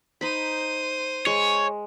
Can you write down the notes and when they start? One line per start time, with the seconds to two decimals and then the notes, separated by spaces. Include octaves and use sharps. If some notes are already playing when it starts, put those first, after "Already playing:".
0.21 D#4 C5 B5 D#7
1.26 G#3 C#5